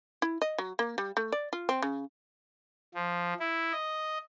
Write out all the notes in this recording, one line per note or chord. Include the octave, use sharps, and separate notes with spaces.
E4
D#5
F#3
A#3
G3
A3
D5
F4
C4
C#3
F3
E4
D#5